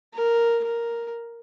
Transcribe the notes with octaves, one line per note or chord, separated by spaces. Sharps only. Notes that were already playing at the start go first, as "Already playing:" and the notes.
A#4
A#4